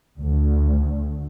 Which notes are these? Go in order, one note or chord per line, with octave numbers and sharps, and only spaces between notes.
D2